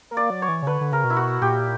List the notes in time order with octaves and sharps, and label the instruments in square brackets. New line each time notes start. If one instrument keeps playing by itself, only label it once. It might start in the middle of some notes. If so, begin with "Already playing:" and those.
[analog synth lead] A#3
[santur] D5
[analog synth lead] F#3
[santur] C#5
[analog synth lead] E3
C#3
[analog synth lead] D3 [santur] B4
[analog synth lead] D3
[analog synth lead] C#3 [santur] A#4
[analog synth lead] B2
[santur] E4
F#4
[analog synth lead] A#2 [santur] G4